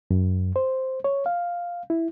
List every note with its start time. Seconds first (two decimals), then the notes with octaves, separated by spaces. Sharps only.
0.11 F#2
0.56 C5
1.04 C#5
1.26 F5
1.90 E4